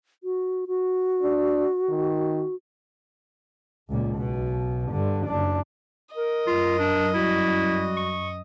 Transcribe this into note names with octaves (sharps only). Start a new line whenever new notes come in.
F#4
F#4
D4
D#3
C#2 A#2
B1 B2
G2 D3
F#1 D4
A#4 D#5
F#2 F4
D4
G3 E4 F#4
C#6